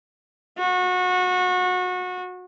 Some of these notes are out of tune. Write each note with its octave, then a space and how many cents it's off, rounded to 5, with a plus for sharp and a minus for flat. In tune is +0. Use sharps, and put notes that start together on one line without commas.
F#4 -25